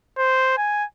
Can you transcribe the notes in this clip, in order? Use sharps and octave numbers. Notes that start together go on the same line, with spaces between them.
C5
G#5